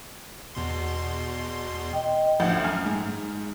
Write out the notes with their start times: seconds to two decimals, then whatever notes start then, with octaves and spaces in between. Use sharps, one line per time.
0.55 E2 B2 C6
1.93 D#5 G5
2.40 A1 D2 F3 F#5 G6
2.64 F#2 G#5 F6
2.86 G#2